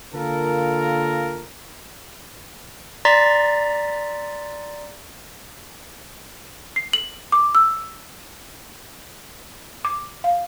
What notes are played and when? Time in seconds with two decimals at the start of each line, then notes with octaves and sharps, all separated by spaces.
0.14 D3 A#3 F4 A4 A#4
3.05 D5 A#5 C6 A6 B6
6.76 C7
6.93 F#7
7.32 D6
7.55 E6
9.85 D6
10.24 F5